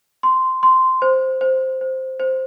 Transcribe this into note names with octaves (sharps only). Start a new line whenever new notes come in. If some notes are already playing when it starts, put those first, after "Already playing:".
C6
C6
C5
C5
C5
C5